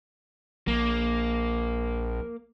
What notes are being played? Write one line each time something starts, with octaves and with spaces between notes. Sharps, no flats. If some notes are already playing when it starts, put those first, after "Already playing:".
A#1 A#3